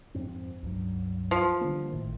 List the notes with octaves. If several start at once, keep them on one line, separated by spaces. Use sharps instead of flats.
F2 G#2 C4
C#2 G2 F#3
F3
D3 G3 A#3
G#1 A2 D#3